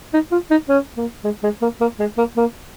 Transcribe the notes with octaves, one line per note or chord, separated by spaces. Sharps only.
D#4
F4
D#4
C#4
A#3
G#3
G#3
A#3
A#3
G#3
A#3
A#3